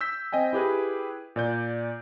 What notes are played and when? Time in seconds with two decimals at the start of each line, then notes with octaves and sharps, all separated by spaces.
0.01 E6 G6 B6
0.32 C4 D#5 G5 G#5
0.53 E4 G4 G#4 B4
1.36 A#2 D5 G6